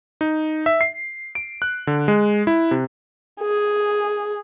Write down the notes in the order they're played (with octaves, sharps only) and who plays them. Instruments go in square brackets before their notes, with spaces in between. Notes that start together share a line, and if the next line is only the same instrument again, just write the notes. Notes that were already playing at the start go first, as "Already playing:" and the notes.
[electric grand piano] D#4
E5
C7
D7
F#6
D3
G#3
E4
C3
[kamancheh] G#4